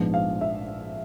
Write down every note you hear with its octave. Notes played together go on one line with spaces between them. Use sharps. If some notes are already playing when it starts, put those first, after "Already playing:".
Already playing: A#1 G#2 F3 G#3 B3
F5
E5